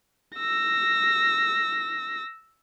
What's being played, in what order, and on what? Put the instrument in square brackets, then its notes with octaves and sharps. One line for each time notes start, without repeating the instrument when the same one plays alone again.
[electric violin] E6 A#6